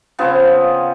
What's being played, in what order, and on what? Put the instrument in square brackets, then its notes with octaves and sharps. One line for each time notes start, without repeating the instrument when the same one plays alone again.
[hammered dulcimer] C#3 F3 B3 C4